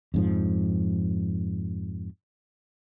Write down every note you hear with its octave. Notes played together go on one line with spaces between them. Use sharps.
F2 G#2 F3